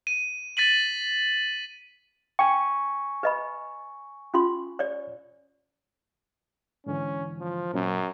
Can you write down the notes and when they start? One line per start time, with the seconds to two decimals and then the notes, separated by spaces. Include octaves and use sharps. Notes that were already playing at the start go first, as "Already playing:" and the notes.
0.07 D#7
0.57 A6 B6 D#7 F#7
2.39 G5 G#5 C#6
3.23 B4 D#5 B5
4.34 C#4 F4 C6
4.79 C#5 D5
6.86 G#2 D3 E3 C#4
7.39 F3
7.74 F#2 A#2 F#3 C#4